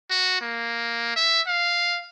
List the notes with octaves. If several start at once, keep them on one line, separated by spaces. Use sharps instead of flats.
F#4
A#3
E5
F5